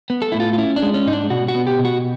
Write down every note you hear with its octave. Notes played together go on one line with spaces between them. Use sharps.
B3
A4
A2 E4
F4
F4
C#4 E4
D4
G#3
C#4
G#2 D#4
D4
B2 F#4
F#4
B3
G4
B2
F#4